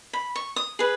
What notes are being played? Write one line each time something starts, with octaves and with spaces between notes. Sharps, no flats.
B5
C#6
D#6
G#4 B4